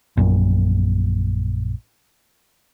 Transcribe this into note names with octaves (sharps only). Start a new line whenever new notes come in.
A#1 F#2 A#2